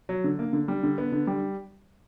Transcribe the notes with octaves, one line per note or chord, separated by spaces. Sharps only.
F#3
D3
A#3
D3
G3
D3
B3
D3
G3